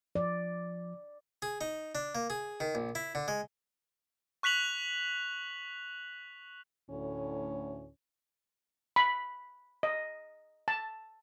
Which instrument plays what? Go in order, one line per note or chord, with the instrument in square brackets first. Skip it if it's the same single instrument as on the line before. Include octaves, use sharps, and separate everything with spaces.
[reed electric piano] F3 [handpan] D5
[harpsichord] G#4
D#4
D4
A#3
G#4
D#3
A#1
E4
D3
G#3
[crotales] C#6 F#6 B6 F7 F#7
[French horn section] D2 A2 [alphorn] C#4
[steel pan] B5
D#5
A5